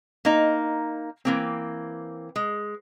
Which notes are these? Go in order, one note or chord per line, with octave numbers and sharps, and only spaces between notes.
A#3 D#4
E3 A#3 C4
G#3